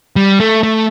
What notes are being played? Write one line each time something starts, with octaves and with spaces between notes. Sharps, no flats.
G3
A3
A3